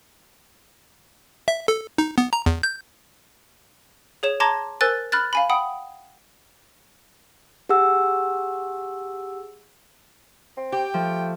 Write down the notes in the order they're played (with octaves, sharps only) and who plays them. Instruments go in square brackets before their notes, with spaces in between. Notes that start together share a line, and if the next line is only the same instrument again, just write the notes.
[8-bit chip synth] E5
A4
D#4
B3
A#5
E2
G6
[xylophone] G#4 C#5 E7
A5 A#5 C6 D6 G#6 A#6
A#4 C5 G#5 E6 F#6 A6
B5 F6 F#6 A6
F5 G#5 B5
F#5 G5 B5 D#6
[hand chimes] G4 G#4 F#5 E6
[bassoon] C4
[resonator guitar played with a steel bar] G4 [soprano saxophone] G5
[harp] F3 [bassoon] A3